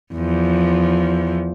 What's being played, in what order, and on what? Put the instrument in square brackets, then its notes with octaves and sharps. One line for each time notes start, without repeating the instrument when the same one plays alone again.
[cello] E2 F3